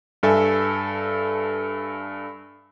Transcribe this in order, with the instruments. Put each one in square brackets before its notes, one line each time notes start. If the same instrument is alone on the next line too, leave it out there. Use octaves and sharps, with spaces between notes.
[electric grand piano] G2 A4 E5 G#5